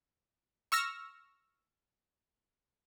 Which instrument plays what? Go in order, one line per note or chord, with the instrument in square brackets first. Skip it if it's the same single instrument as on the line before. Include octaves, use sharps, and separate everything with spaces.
[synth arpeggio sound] C#6 E6 F6 A#6